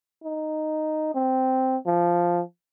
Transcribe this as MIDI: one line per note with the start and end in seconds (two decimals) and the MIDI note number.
0.24 1.12 63
1.15 1.77 60
1.87 2.42 53